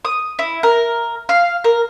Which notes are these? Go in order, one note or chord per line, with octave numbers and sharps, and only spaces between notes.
D#6
E4
A#4
F5
A#4